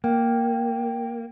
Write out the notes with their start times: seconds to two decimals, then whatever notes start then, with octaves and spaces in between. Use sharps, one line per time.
0.04 A#3 G5